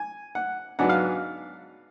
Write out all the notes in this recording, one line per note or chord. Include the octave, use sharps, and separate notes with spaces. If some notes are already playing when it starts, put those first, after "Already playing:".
Already playing: G#5
F#5
G#2 F#3 B3 D4 F#5
F5